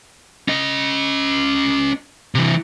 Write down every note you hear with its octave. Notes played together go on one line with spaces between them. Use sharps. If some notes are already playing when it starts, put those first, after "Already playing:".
C#4 D#5
C3 E3